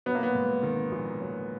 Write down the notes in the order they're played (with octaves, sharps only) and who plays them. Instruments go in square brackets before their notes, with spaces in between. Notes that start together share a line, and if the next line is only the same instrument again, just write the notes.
[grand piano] F#3 [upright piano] B3
[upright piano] A#3
B3
[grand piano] G#2
D#3
A#1
F#3